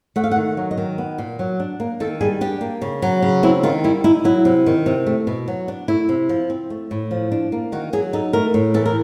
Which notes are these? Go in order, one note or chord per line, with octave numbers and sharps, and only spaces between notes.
A3 F#5
F5
F#5
D#3
F#3
D#5
D#3
B3
A#2
F#3
D4
A#3
D#3 A4
G3 G#4
D4 G4
A#3
C#3
F#3
C#3
C4 E4
D#3 F4
G3 E4
D#4 E4
F#3 E4
C3
D#3
C3
A3
B2
F#3
D4
A3 E4
C3
F3
C4
A3
A2
F3
D4
A#3
D#3 F#4
F#3 G#4
D#4 A4
A3 A#4
A2
E3 A4
A#4